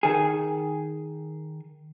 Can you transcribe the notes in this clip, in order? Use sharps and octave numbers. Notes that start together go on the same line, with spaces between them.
D#3 G#4